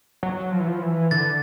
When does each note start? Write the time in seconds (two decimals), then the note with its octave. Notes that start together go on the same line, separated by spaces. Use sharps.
0.23 F#3
0.52 F3
0.60 E3
0.68 F3
0.82 E3
1.11 D3 A6